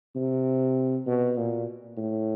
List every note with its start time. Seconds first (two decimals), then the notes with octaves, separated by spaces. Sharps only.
0.16 C3
1.06 B2
1.37 A#2
1.97 A2